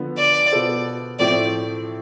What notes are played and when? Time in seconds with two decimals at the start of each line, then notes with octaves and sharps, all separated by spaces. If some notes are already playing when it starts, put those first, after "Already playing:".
Already playing: D3 F3 B3
0.18 D5
0.51 B2 B3 F4 A4 C5
1.19 A2 F3 A3 C4 E4 D5